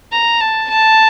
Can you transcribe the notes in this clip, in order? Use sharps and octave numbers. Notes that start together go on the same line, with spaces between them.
A#5
A5
A5